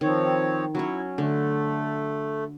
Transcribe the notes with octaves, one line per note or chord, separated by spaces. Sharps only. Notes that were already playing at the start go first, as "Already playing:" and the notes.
D#3 F3 C4 C#5
F#3 C#4 E4 C#5
D3 A3